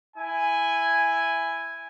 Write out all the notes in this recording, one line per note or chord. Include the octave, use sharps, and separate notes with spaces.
E4 G#5